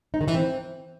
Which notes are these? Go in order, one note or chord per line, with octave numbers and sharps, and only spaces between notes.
D#4
D#3
E3
C4